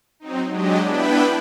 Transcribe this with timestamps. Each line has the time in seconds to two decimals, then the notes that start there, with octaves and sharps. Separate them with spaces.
0.20 F#3 C4 D#4
0.50 F#3 G#3 D4 G4 D#5
0.83 B3 D4 E4 B4 G5 B5